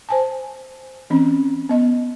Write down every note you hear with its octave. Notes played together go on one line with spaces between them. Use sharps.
C5 G#5 A5
E3 C4 C#4
B3 D#5